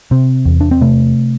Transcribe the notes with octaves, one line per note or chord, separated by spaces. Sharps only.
C3 C4
E2
D4
C4
C3 A3